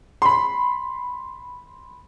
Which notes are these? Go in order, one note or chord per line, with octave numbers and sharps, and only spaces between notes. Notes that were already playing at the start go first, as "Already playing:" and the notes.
B5 C6